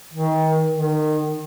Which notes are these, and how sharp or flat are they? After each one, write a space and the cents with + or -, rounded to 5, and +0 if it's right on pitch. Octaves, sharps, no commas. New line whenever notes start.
D#3 +30
D#3 -25